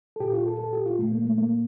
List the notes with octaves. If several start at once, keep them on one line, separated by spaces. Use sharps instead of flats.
A4
A#2 G4
F4
A4
A4
G4
F4
A#2 A3
A#3
A3
A#3